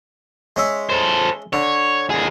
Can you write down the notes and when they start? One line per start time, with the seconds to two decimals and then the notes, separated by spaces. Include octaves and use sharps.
0.56 G#3 C#4 E5
0.89 A4 C5
1.53 D3 C#5
2.10 D#2 G#4